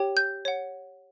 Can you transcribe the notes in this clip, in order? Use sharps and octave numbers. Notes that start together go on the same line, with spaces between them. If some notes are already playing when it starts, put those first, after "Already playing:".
Already playing: G4 C#5 G5
G6
C#5 F#5